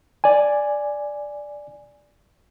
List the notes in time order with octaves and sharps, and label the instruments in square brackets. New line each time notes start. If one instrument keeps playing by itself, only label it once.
[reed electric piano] D5 G#5